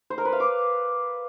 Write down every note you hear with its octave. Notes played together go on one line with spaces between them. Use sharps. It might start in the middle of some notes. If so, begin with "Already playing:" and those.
C5
A#4
B4
F5
D6